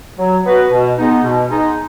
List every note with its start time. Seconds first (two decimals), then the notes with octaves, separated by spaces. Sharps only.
0.18 F#3
0.45 B3 F#4 B4
0.71 B2
0.98 G#3 B3 D#4
1.23 B2
1.50 G#3 B3 D#4